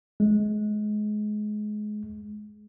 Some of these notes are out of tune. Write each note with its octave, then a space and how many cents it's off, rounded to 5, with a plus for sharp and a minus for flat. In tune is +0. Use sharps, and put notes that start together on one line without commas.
G#3 +25